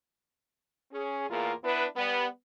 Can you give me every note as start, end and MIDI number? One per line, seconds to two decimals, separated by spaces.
0.93 1.27 61
0.93 1.27 68
1.30 1.52 40
1.30 1.52 45
1.30 1.52 58
1.30 1.52 65
1.30 1.52 68
1.30 1.52 70
1.64 1.85 59
1.64 1.85 62
1.64 1.85 64
1.64 1.85 71
1.96 2.25 55
1.96 2.25 59